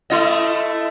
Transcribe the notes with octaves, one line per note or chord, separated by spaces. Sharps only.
A3 E4 D#5